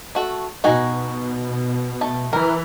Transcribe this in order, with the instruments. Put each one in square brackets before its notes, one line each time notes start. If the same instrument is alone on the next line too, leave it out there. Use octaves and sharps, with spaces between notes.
[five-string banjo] A3 F#4 A4
[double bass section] B2 [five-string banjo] D#4 F#4 G#5
[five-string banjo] A3 A5
[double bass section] E3 [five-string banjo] A#4